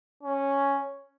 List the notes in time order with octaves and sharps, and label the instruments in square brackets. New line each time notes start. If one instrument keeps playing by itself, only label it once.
[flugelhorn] C#4